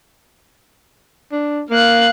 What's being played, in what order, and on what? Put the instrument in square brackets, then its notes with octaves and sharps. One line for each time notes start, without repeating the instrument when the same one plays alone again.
[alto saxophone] D4
[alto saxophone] A#3 [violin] F5 F#6